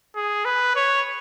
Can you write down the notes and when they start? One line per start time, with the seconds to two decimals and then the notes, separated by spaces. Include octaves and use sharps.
0.15 G#4
0.45 B4
0.76 C#5